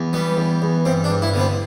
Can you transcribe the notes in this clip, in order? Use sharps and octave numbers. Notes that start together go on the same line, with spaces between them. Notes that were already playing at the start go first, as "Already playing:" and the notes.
Already playing: E2
G3 B3
E2
E2
G2 C4
D4
G2
E4
D3 B3
C4